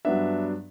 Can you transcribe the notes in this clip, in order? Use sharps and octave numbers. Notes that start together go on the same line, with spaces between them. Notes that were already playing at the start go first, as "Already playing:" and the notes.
G2 F#3 B3 D4 E5